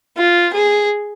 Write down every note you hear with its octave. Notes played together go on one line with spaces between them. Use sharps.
F4
G#4